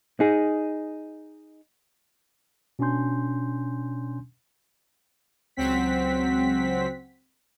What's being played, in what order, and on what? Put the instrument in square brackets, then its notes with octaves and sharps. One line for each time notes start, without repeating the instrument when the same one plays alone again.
[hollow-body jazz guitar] D#4 G#4
[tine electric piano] B2 C#4 D4 G#5 C6 G6
[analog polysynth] C#2 F#3 C4 F#5 B6